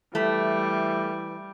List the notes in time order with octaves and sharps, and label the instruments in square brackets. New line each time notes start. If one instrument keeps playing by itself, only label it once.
[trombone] E3 [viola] G3 [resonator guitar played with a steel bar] A3